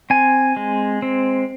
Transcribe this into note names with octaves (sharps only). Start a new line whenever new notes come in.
C4 G#5
G#3
C4